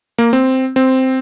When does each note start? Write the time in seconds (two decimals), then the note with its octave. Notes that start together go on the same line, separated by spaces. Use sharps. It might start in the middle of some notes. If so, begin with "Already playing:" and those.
0.18 A#3
0.33 C4
0.76 C4